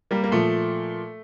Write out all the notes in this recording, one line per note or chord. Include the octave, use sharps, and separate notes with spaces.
G3 A#3
A#3
A#2 F3 A3